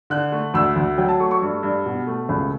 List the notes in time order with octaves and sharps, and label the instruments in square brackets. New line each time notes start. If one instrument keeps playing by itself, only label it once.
[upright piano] D3 F#6
A3
D2 E6
D2
F#3 G5
A5
A3 C#6
C#6
G2
G2
B2
A3
C#2